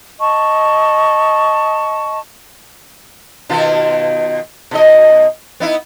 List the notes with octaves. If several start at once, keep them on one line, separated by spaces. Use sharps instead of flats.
D#5 A5 C#6
B2 D#3 F4
B2 D#4 D#5
B3 D#4 E4